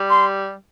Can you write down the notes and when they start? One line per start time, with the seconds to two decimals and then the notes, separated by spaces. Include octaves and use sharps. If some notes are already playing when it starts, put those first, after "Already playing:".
Already playing: G3
0.10 C6